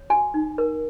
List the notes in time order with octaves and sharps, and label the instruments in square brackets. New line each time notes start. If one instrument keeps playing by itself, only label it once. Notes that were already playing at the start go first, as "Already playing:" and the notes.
Already playing: [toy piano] C#5
F#4 G#5
D#4
A#4